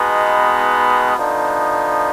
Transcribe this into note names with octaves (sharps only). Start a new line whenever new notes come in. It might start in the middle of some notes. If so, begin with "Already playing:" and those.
Already playing: B2 G#3 B3 D#4
D3 F3 B3 D#4